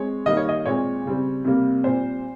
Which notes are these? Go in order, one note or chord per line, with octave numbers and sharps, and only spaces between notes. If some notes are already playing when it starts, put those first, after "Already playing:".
Already playing: G#3 C4 C#5
D#3 G3 A#3 D#5
C#5
D#5
A#2 G#3 C4 C#5
C#3 G3 C4
C3 G3 A#3
A#2 G3 C4 C5